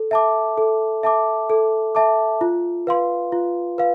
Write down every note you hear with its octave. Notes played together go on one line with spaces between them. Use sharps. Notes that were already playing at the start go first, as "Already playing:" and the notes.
Already playing: A4
E5 A5 D6
A4
E5 A5 D6
A4
E5 A5 D6
F4
B4 F5 C6
F4
B4 F5